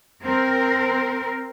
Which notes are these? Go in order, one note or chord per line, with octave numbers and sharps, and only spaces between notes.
C4 A#4